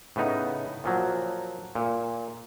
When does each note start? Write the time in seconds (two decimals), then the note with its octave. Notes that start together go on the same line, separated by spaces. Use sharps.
0.16 A2 C#3 B3 D#4
0.84 A#2 F3 F#3
1.75 A#2